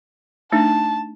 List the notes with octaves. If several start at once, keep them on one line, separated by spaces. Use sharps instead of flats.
A3 D4 D#4 A5